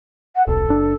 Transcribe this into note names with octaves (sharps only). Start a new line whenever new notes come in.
F#5
D#1 B1 A4
F#1 D4